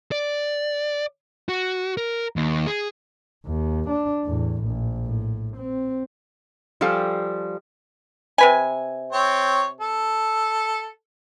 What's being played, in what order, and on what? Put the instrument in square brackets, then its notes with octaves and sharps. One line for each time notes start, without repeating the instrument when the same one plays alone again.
[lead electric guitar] D5
F#4
A#4
D#2
G#4
[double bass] D#2
D4
E2 A2
A#1
A2
C4
[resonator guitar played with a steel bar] F3 G3 G4 A4 F5 G#5
[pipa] C3 B4 G#5
[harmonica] C4 C#5
A4